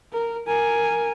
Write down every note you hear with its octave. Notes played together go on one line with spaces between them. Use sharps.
A#4
A#4 G#5